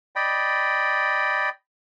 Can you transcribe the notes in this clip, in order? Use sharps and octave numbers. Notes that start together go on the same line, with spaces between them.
D5 D#5 G5 B5